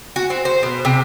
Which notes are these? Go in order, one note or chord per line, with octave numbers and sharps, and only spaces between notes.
F#4
C4
C5
B2
C3